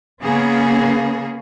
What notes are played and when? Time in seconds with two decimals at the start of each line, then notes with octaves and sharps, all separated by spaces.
0.23 C#3 A#3 B3 C#4 G#4